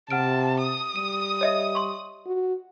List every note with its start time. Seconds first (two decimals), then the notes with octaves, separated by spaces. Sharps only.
0.10 C3 F#5 A5 F6 D7
0.62 D#6
0.96 G3 D#7
1.41 C#5 D#5 E5
1.75 C6 C#6
2.26 F#4